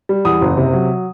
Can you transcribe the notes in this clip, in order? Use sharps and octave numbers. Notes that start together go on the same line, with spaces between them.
G3
E2 D#6
F#1
C3
F#3